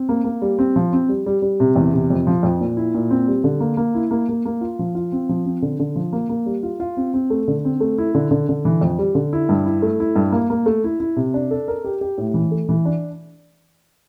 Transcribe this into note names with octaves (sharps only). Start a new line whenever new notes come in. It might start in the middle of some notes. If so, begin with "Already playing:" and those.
Already playing: C4
A#3
A#3
G3
C4
F3
C4
G3
G3
G3
C3
E2
C3
F2
F3
F2
A#2
E4
A#2
C4
G3
D3
A#3
A#3
E4
A#3
A#3
A#3
F4
F3
F4
C4
F3
C4
D3
D3
F3
A#3
A#3
G3
F4
F4
C4
C4
A3
D3
C4
A3
E4
D3
D3
D3
E3
F2
G3
D3
E4
G2
E4
A3
E4
G2
A#3
A#3
A3
E4
E4
C3
D4
A4
A#4
G4
G4
A2
E3
A3
E3
D4